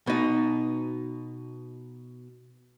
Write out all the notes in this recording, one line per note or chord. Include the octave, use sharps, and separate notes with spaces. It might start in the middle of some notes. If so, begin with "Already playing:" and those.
B2 D#4